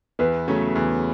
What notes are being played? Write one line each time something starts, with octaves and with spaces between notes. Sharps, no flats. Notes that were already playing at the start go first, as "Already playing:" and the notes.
E2 B3 B4
C#3 F#3 A3 C#4
E2